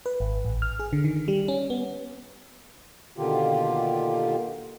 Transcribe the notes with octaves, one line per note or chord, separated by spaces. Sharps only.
B4
G#1
A1
F6
G#4
D3
D#3
G3
C#4
B3
B2 D3 D#3 A#3 F4 G4